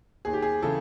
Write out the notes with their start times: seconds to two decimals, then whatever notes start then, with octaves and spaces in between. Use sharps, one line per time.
0.25 D#2 G#4
0.33 G4
0.42 G#4
0.62 C#3 E3 A4